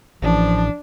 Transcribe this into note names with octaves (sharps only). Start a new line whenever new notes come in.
A1 F3 D4